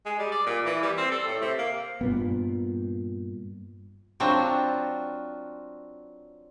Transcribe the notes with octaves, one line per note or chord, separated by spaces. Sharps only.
G#3
G3
D5
A#2
E3
G3
C4
A4
A2
C3
A#3
G2 A#2 B3
F#3 C4 D4 F4 F#4